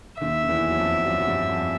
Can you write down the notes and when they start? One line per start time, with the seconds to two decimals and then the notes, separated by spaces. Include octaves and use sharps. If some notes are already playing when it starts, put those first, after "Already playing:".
0.21 D#2 D#3 E5
0.43 D#3
0.49 E2 E3
0.70 F#3
0.78 F2 F3
1.06 F#2 F#3
1.19 F#3
1.28 G2 G3
1.49 F2 F3